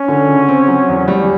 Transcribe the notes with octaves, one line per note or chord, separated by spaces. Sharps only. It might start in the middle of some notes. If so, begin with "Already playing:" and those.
Already playing: C#4
D3
C#3
C4
F#3
E2
G3